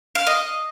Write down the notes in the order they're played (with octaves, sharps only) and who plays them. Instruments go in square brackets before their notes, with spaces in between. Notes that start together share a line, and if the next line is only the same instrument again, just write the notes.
[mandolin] F5
D#5